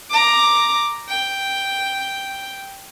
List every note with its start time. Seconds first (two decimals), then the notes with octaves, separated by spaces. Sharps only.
0.11 A#5 D6
1.09 G5